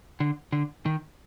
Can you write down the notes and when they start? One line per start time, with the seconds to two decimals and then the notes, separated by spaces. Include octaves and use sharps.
0.20 D3
0.52 D3
0.86 D#3